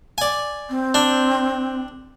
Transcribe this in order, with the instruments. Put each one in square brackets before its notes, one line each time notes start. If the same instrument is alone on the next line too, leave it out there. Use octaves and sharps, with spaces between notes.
[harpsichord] D5 G#5
[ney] C4
[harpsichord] D4